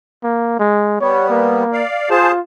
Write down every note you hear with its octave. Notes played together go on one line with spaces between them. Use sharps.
A#3
G#3
G3 B3 C#5
A#3
D5 F5
F4 G#4 C5 A5